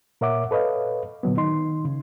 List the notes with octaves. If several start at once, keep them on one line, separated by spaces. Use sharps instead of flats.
A#2 A#4 C#5 E5 F#5 D6
A4 B4 C#5 D#5 F5
A#2 D3 F#3 B3
D#3 D#4 C6
C#3